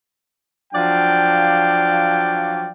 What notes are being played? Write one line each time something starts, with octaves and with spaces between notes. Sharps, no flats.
F3 F#3 D4 D5 F5 G5